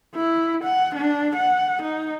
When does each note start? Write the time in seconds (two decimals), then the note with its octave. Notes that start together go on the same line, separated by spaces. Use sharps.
0.15 E4
0.64 F#5
0.95 D4
1.36 F#5
1.82 D#4